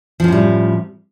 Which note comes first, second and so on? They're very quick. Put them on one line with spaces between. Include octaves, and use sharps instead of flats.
F3 F#2 A2 G3